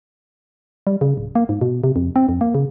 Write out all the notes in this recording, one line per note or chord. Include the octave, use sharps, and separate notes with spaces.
G3
C#3
D1
A#3
G#2
B2
C3
F2
C4
F2
A#3
C#3